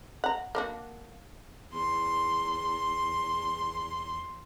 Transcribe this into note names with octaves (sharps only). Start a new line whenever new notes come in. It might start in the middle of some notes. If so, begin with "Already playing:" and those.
F#5 A#5
A#3 D4 F#4
E2 C6